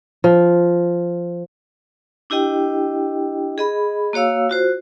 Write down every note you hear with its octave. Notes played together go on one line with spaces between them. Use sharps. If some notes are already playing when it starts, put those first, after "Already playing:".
F3
D4 E4 G4 D#5 G5
G#4 D#5 B5
A#3 F#4 C#5 F5 E6
F4 F#4 C5